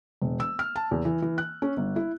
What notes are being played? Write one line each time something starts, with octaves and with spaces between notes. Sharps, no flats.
E1
E6
F6
A5
E2
E3
E3
F#6
C#4
G1
E4